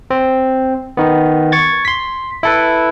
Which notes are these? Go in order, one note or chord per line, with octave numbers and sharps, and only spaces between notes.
C4
D#3 B3
C#6 G#6 A6
C6 B6
E4 A4 B4